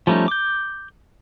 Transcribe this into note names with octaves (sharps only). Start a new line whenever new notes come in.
F3 G3 A3 C#4 D#4
D6 G6